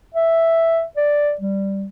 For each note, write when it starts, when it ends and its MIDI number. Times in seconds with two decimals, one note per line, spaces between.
0.14 0.84 76
0.97 1.34 74
1.40 1.86 55